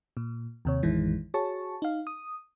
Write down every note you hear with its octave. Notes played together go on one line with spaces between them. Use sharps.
A#2
D#2 C3 C#5
A1 F2 D#3 E3 G#3
F#4 G#4 C#5 A5 C#6
D#4 F5
D#6